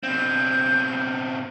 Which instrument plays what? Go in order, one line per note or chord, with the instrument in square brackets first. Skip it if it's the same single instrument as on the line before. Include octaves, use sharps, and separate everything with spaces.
[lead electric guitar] B2 C4 [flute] G6